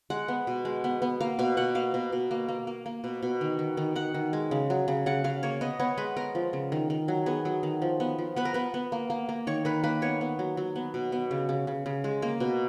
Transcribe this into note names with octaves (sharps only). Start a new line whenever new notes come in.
G#3 F#5
B3
B2
G#3
B3
B3
A#3 F5
B2 F5
B2 F#5
A#3 F5
B2
B2
A#3
A#3
A#3
A#3
B2
B2
D#3
D#3
D#3
D#3 F#5
D#3
G#3
C#3
F#3
C#3
C#3 F#5
C#3 F5
A#3 C#5
B3 D#5
B3 C#5
G#3 B4
B3 A#4
F3
C#3
D#3
D#3
F#3
B3 G#4
F#3
D#3
F3
B3
F3
B3 B4
A#4
B3 B4
B3
A#3
A#3
A#3
D#3 C#5
D#3 B4
A#3 B4
B3 C#5
B3
F#3
F#3
B3
B2
B3
C#3
C#3
C#3
C#3
G#3
A#3
B2